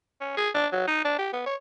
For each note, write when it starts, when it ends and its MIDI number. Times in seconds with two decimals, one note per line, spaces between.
0.21 0.37 61
0.37 0.49 68
0.54 0.67 62
0.72 0.86 54
0.87 1.03 63
1.04 1.18 62
1.18 1.29 67
1.32 1.42 59
1.46 1.55 73